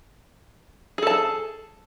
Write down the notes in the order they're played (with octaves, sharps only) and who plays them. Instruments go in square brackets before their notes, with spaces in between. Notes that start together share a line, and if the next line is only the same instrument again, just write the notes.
[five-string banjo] G#4
A4
A5